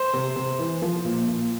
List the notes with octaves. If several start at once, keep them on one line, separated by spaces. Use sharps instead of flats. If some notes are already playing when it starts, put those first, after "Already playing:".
Already playing: C5 C6
C3
C3
E3
F3
A#2
A#2